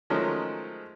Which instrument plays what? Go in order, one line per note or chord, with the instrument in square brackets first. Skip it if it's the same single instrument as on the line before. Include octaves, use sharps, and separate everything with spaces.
[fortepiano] D#3 F3 F#3 G#3 A3 C#4